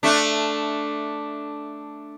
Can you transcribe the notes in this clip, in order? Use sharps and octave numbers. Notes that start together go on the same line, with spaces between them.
A3 D4